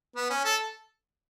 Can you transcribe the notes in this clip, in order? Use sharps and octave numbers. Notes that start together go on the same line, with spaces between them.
B3
C#4
A4